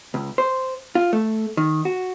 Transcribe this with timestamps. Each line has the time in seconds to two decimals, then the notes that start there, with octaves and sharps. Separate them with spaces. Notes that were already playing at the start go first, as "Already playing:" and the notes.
0.14 C#2
0.38 C5
0.95 F4
1.13 A3
1.57 D#3
1.85 F#4